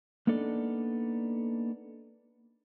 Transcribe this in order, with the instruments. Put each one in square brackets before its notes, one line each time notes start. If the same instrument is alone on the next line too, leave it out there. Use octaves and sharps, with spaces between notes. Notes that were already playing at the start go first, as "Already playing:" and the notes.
[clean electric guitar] A#3 B3 D4 D#4 A4 D5